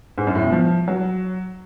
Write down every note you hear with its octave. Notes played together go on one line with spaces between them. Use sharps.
G#2
F#2
A2
B2
F3
F#3